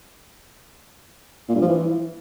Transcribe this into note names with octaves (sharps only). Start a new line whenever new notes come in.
A#2
G2
F3
E3